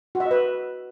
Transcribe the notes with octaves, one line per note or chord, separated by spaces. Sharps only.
F#4
E5
D#5
B4